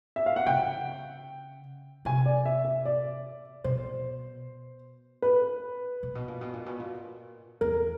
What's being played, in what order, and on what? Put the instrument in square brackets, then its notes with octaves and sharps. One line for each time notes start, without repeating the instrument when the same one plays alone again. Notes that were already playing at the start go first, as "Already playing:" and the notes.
[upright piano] E5
F5
F#5
[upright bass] C#3 [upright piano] G5
[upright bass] C3 [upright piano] G#5
[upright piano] D5
E5
E5
D5
[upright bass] B2 [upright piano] C5
[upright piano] B4
[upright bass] A#2
B2
A#2
B2
A#2
B2
A#2
[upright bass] E2 [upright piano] A#4